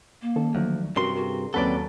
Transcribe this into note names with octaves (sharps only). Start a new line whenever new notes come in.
A#3
D#3 C#4 A4
D2 D#3 F3 F#3
G2 C3 C#4 F#4 A#4 C6
F#4 G#4 A#4
D#2 F#3 C4 C#4 A4 B4 D5 F#5